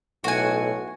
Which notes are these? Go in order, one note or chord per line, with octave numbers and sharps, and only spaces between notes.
B1 A2 F#4 G#5